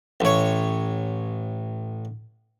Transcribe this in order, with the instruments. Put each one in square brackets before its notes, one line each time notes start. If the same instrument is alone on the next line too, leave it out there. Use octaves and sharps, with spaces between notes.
[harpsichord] A1 C#5